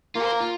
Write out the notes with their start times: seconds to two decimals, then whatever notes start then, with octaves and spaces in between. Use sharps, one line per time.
0.15 A#3 F4
0.24 C5
0.31 A#4
0.40 F4